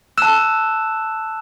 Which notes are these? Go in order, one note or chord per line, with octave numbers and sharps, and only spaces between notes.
A5 E6 F#6 E7